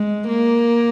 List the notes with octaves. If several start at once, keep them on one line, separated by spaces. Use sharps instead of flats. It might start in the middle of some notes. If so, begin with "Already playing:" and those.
Already playing: G#3
A#3